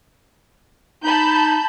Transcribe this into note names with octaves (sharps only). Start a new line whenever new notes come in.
D#4 A5 B5 G6